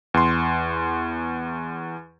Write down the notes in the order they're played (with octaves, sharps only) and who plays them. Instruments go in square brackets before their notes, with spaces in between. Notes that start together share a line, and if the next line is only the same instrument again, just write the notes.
[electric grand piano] E2 C6